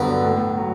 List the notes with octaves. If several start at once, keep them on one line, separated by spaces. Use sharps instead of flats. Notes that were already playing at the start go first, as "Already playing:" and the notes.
Already playing: G2 D3 F#3 B3
A2
F#3